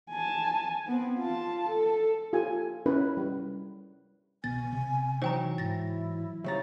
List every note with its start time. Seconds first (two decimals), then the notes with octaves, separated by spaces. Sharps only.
0.11 G#5 A5
0.87 B3 C4
1.19 F4 A5
1.70 A4
2.33 F4 G4 A4 G#5
2.86 C#4 E4 A#4 B4
3.17 G3
4.44 C2 B2 B3 G#5 A6
4.73 C3
5.22 E3 F#3 D#4 C5 G5 A#5
5.58 G#2 E4 A6 A#6
6.44 C#3 G3 E4 C#5 A#5 A6